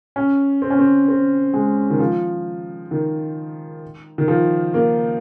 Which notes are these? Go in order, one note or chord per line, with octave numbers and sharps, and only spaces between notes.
C#4
C4
C#4
C4
C4
G#3
D#3
F3
D#3
D#3
F3
A#3